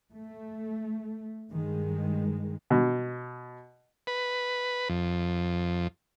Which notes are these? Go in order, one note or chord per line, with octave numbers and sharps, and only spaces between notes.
A3
G2 D#3 G#3
B2
B4
F2